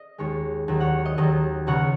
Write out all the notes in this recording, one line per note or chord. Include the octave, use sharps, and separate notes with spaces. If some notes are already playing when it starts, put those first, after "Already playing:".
Already playing: D#5
D#2 D#3 G#3 C#5
D#2 D#3 F#3
C#5 F#5
D#5
D#2 D#3 F#3 D#5
C#2 C#3 F#3 C#5 F#5